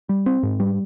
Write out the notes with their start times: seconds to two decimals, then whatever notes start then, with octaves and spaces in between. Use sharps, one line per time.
0.09 G3
0.26 C4
0.43 G#2
0.60 G3